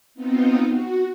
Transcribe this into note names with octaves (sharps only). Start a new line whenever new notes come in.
B3 C4 D#4 F4
F#4